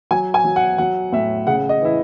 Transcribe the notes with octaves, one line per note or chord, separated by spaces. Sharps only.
F#3 G#5
G#5
F#3
F#5
F#3 F#5
A2 E5
C#3 F#5
D#5
E3 E4